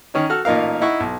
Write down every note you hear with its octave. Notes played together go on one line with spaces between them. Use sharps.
D#3 C#4 D#4
F#4 A4 F6
A1 A#2 D#4 A#4 F5
D#4 E4 F#5 C#6
B1